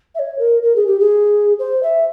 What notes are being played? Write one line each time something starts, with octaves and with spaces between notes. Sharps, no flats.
E5
C#5
A#4
A#4
G#4
G4
G#4
C5
E5